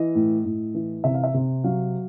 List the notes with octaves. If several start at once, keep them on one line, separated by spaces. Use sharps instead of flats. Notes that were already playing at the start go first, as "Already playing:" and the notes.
Already playing: E3 D#5
A2
A2
E3
C3 E5
F5
E5
C3
F#3 F5